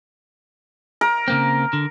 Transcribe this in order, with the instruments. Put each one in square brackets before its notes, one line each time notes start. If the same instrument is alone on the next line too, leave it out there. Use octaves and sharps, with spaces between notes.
[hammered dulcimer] A#4
[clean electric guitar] C#3 A#3 C4
D3